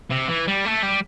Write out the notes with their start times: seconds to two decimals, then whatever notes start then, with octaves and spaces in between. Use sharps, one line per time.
0.10 C3
0.28 E3
0.47 G3
0.65 A3
0.82 G3